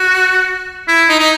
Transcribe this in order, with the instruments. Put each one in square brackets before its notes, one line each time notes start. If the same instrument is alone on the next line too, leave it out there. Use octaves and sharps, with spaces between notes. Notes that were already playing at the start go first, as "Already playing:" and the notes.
Already playing: [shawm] F#4
E4
D#4
D#4